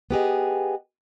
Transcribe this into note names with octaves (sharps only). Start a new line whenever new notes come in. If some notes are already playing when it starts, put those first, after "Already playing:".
B3 G4 G#4 D#5